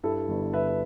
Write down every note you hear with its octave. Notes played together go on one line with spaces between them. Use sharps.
G2 E4 A4
G1
G1 B4 E5
B4